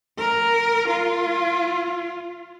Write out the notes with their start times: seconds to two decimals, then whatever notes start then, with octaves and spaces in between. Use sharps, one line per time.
0.18 A#4
0.88 F4